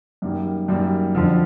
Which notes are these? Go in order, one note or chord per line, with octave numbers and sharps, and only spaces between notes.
F#2 D#3 G3 A#3
F#2 D#3 G3 A#3
F2 D3 F3